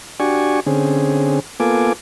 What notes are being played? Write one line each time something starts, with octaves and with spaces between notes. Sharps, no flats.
D4 F#4 G4 D5 G#5 C#6
D3 C4 C#4 G#4
A#3 B3 F4 A4 G#5 D6